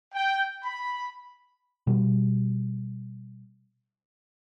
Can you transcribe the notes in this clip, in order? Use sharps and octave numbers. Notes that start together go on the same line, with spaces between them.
G5
B5
B2 G3